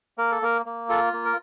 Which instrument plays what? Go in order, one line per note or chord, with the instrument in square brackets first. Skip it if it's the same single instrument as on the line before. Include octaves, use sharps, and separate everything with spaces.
[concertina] A#3 A#4
A4
A#3 A#4
A#3
F4 A4
A#3
A#4